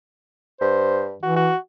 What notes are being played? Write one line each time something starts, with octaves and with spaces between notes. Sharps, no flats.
G2 C5
E3 F#4
F#4